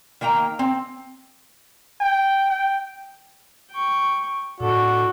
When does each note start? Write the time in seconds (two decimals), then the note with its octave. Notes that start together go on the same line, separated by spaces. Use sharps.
0.21 D#3 A#3 G5 A#5
0.59 C4
2.00 G5
2.50 G5
3.71 G5 C#6
4.60 A2 D4 F#4 A4